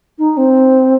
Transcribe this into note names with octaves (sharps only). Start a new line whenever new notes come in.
D#4
C4